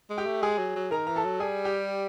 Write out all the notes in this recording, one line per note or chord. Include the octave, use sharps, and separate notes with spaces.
G#3
G4 G5
A3
G#3 G#4 G#5
F#3
F#3
D#3 A#4 A#5
E3 A#5
A4 A5
F#3
G3 G#4 G#5
G4 G5